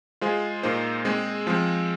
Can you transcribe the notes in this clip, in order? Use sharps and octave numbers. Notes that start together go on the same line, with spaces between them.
G#3 F4 G#4 C5
A#2 A#3 D#4 C5
G#3 C4 G#4
F3 G#3 C4